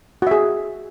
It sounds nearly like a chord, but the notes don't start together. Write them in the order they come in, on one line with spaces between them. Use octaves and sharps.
F#4 E5 G#4